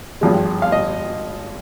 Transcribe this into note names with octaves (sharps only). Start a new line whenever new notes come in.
G#1 G2 F3 G#3
F5
D#5